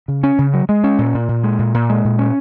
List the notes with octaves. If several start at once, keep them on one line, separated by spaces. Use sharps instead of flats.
C#3
C#4
C#3
F#3
G#3
C#4
A#2
A#2
A#2
G#3
A#2
A#2
G#3
A#2
C#4